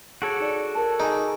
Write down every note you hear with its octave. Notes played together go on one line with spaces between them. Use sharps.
F#4 G#4 A4 C#5 D7
D#4 D5
A#4 A5
D#4 G#4 G#5